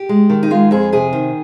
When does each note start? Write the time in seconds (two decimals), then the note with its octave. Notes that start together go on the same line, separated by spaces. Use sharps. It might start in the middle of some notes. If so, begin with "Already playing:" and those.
Already playing: G4
0.09 G#3
0.30 D#3
0.43 D#4
0.51 G#3 F4
0.71 F2 G#4
0.92 C3 G#4
1.13 D#3